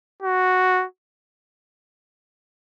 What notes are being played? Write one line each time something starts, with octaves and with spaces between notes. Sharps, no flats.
F#4